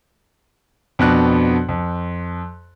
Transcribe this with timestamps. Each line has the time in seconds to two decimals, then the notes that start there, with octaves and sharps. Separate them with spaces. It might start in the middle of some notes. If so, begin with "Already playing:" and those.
0.99 F2 B2 B3 D4 F#4 F#6
1.69 F2